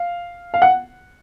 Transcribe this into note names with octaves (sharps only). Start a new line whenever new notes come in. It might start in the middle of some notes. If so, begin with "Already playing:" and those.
Already playing: F5
F5
F#5